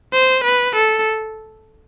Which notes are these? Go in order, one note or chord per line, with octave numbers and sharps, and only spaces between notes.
C5
B4
A4